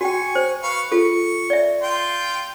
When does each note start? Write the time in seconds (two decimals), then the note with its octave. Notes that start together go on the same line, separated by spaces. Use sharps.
0.01 F#4 G5 G#5 C#6
0.35 C5
0.63 B4 F5 C#6
0.92 F4 A4 C#6
1.50 D5 E5
1.83 F4 G5 C6